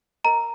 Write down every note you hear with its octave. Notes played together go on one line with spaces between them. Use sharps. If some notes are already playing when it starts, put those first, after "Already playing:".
A#4 D#5 A#5